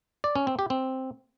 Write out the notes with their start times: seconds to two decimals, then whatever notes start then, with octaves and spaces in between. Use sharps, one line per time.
0.24 D5
0.36 C#4
0.47 C4
0.59 G4
0.70 C4